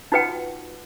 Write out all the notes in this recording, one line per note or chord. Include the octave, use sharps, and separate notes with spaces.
D#4 F4 F#4 B4 F#5 G5